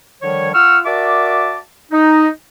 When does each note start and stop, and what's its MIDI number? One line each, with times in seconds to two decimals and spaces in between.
0.23 0.50 50
0.23 0.50 51
0.23 0.50 53
0.23 0.50 55
0.23 0.50 73
0.54 0.80 65
0.54 0.80 78
0.54 0.80 85
0.54 0.80 88
0.54 0.80 89
0.86 1.58 66
0.86 1.58 70
0.86 1.58 74
0.86 1.58 76
0.86 1.58 81
0.86 1.58 86
1.92 2.29 63